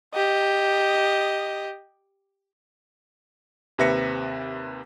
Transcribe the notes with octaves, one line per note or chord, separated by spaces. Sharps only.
G4 D#5
D#2 C3 B4 E5 A#6 C#7